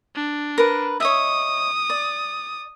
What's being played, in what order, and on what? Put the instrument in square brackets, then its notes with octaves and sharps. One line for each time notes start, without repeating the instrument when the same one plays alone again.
[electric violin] D4
[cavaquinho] A#4 B4
[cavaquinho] C#5 D#5 E5 [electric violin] D#6
[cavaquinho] D5